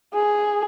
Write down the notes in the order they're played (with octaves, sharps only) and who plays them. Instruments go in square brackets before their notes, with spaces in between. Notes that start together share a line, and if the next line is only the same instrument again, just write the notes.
[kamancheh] G#4